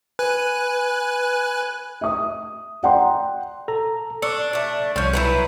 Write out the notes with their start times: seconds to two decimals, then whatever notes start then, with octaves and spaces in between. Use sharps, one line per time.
0.19 B4 G#5 F#6
2.01 E5 D#6
2.83 D5 F#5 G5 A#5 C6
3.68 A4 A#5
4.22 D4 C#6 E6 C#7
4.53 A3 D4
4.96 C2 F3 C#4 G6
5.13 E3 F#3 B4